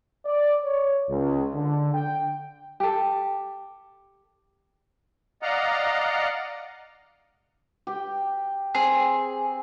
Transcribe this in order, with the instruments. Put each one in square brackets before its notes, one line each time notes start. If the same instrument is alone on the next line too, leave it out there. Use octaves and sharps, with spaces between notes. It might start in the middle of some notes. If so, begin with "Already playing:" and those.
[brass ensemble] D5
C#5
C#2
D3
G5
[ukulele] G4 A4
[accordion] D5 D#5 F5 F#5 A#5
[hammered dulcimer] G4 G5
[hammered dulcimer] C4 [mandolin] G#4